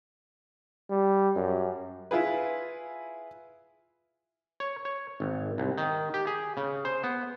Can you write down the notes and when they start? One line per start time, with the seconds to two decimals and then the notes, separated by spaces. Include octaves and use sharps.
0.90 G3
1.35 F#2
2.11 E4 F4 G#4 B4
4.60 C#5
4.85 C#5
5.20 G#1
5.58 C2
5.78 D#3
6.14 G4
6.27 G#4
6.57 C#3
6.85 C5
7.03 B3